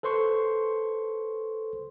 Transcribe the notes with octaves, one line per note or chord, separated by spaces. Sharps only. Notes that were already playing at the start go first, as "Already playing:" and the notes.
A4 B4 C5 C6 C#6